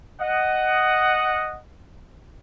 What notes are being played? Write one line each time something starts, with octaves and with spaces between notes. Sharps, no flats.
D#5 F#5